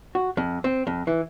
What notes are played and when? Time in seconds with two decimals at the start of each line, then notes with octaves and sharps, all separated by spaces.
0.15 F#4
0.37 F2
0.64 C4
0.87 F2
1.07 E3